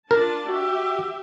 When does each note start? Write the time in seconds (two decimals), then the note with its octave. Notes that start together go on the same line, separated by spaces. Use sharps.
0.11 D4 F4 A#4 A5
0.48 F#4 G4 E5